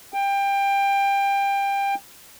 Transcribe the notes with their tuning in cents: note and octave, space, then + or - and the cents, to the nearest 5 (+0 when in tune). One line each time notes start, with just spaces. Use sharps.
G5 +20